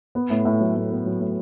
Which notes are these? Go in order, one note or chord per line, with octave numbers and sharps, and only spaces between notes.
B3
A2
A2
F#3
A2
B3
F#3
A2